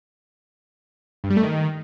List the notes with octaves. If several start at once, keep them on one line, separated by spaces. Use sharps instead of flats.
G2
G3
A3
D#3